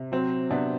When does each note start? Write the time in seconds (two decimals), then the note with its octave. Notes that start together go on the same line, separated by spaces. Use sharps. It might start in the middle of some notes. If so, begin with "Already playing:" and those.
Already playing: C3
0.12 F#3 C4
0.51 C3 B3 D4